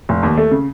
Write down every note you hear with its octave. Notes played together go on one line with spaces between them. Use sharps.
F1
D#2
A3
C#3